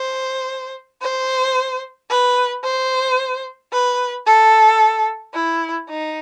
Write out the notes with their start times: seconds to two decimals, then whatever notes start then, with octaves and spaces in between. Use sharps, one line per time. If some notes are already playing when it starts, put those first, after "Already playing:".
Already playing: C5
1.02 C5
2.10 B4
2.64 C5
3.73 B4
4.27 A4
5.34 E4
5.89 D#4